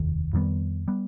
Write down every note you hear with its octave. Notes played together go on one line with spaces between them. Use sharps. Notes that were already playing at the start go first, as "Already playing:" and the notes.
Already playing: F1 D#2 D#3
F2 D#3 G3 B3
G3 B3